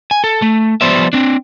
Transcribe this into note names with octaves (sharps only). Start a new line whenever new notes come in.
G#5
A4
A3
F3 G3 B3 C5 D5 E5
C4 D4